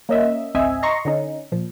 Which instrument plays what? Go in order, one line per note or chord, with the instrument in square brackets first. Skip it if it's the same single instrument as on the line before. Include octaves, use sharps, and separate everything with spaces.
[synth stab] A#3 C#4 D#5 E5
G#1 C#2 C4 D#5 E5 G#5
D#5 A#5 C6 C#6 A#6
D3 C#4 D#4
A#2 F3